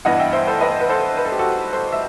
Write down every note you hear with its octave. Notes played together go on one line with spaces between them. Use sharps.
G2 E3 B3 D#5 F#5
E5 G5
C5 E5
A4 C5
B4 D#5
B4
A4 C5
B4
A4
G4
F#4 A4
A4 C5
E5